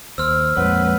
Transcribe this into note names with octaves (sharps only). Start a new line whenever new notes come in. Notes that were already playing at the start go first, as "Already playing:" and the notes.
D#2 C5 C6 E6 F6
A#1 F2 A#2 G#3 B4 C#5 F#5